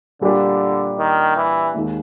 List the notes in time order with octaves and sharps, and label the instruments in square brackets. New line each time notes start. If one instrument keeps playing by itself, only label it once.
[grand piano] A#2 G3 A#3 D4 G4 [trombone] D3
[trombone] D#3
E3
[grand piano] D#2 D#3 G#3